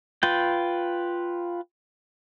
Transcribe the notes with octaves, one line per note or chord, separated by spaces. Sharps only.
F4 B4 G5